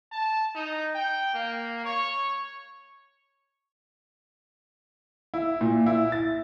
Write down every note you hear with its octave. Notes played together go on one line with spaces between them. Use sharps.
A5
D#4
G5
A#3
C#5
E4
A#2
E4
A6